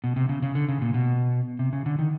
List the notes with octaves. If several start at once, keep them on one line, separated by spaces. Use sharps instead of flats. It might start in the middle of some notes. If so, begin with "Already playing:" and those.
B2
C3
C#3
C#3
D3
C#3
A#2
B2
C3
C#3
D3
D#3